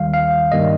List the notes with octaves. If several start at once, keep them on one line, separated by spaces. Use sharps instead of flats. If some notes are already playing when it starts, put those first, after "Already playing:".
Already playing: D#2 D#3 G3 F5
F5
G2 D#3 G3 A#3 D#5